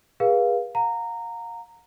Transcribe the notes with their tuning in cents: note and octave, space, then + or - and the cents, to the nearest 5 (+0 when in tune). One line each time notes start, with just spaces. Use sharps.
G#4 -25 B4 -35 F5 +0
F5 +40 A#5 -15